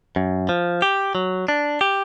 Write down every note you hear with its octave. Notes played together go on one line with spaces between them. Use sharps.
F#2
F3
G4
F#3
D4
G4